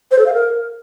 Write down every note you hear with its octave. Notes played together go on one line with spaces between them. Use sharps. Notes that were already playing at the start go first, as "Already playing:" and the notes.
C5
A4
F5
A#4